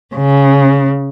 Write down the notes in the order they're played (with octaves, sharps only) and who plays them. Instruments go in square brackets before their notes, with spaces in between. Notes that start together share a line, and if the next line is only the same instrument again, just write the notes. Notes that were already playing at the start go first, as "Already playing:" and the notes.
[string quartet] C#3